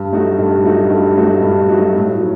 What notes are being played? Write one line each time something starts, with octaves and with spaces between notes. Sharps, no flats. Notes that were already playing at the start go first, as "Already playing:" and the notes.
Already playing: G2
F#3 A3 D#4 F#4
G2
F#3 A3 D#4 F#4
G2
F#3 A3 D#4 F#4
G2
F#3 A3 D#4 F#4
A2
F#3